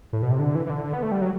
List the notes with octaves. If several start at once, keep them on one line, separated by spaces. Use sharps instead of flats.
A2
B2
C3
D3
E3
E3
D3
B3
A3
G3
F#3